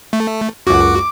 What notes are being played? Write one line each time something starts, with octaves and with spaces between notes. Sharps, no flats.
A3
C#2 F#2 F#4 D6